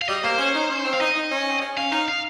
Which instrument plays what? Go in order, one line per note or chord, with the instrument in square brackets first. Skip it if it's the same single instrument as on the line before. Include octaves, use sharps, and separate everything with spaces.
[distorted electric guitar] F5
[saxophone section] G3 [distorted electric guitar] D#5
[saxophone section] A#3 [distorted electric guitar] C5
[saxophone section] C#4
D#4
C#4
C4
[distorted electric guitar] F5
[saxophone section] D#4 [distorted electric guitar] D#5
[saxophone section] D#4
C#4
C4
C#4
[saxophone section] C#4 [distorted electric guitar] F5
[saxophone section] D#4 [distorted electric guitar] F5
[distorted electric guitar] F5